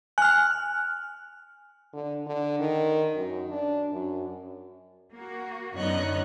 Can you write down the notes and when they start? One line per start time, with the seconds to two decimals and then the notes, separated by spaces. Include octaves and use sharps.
0.18 G#5 F6 F#6
1.93 D3
2.26 D3
2.60 D#3
3.15 F#2
3.49 D4
3.93 F#2
5.14 A#3 F#4
5.75 F#2 D3 B3 D#4 C#5 D#5 F#6